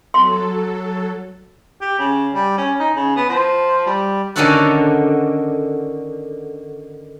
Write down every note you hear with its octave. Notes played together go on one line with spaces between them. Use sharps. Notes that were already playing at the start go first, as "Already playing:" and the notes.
F#3 A4 C6
G4
C#3
G3
C#4
D#4
C#3
B3
F3
G3
D3 D#3 C#4 F#4 A4 F#5